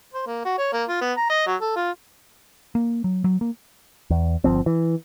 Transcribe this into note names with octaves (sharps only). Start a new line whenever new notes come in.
C5
A#3
F#4
C#5
A#3
F4
B3
A#5
D#5
F#3
A4
F4
A#3
F#3
F#3
A#3
E2
G1 E2 F3 C4
E3